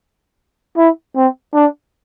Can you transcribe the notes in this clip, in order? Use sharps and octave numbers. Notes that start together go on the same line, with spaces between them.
E4
C4
D4